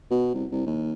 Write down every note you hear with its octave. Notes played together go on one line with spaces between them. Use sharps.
B2
C2
C2
D#2